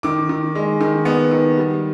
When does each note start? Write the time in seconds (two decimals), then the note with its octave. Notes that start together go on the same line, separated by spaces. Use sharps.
0.03 D#3 D6
0.29 D#3
0.55 G#3
0.81 D#3
1.05 B3
1.31 D#3
1.57 G3